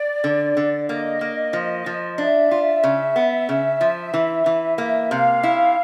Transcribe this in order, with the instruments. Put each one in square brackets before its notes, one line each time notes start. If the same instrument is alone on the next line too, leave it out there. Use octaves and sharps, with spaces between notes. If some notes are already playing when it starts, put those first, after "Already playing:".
Already playing: [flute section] D5
[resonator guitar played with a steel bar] D3
D3
[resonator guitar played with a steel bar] A#3 [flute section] D#5
[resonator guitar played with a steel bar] A#3
F3
F3
[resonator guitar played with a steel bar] D4 [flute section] E5
[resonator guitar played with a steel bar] F4
C#3
B3
C#3
F3
E3
E3
[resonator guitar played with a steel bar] A#3 [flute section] E5
[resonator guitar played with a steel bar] C3 [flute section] F5
[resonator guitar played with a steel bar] E4